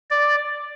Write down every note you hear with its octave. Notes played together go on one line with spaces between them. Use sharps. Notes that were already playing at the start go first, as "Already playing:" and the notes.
D5